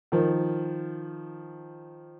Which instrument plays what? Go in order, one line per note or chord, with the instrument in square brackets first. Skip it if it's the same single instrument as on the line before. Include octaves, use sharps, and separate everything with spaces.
[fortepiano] D#3 F3